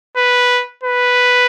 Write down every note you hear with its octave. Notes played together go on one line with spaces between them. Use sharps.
B4
B4